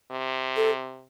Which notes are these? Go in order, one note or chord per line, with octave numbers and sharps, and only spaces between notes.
C3
A4